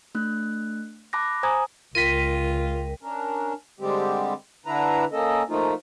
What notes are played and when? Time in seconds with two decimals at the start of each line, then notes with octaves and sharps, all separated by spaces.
0.15 A3 D4 F#6
1.13 A5 B5 D6 F#6 A#6
1.43 C5 G#5 A#5 D#6 G#6
1.95 C#2 F4 A#4 G5 B6 D#7
3.03 C#4 D4 A#4
3.80 D3 G3 G#3 C4 G4
4.66 D3 D4 E4 B4 A#5
5.12 A#3 C#4 A4 D#5
5.49 F3 A3 A#3 D#4 F4